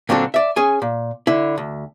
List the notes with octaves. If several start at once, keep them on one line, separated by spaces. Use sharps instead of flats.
A#2 D3 F#3 C4 D4 A4
D5 E5
C#4 G#4 G#5
A#2
D3 E4
D2